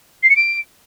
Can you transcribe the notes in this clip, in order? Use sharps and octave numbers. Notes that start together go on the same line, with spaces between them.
C7
C#7
D7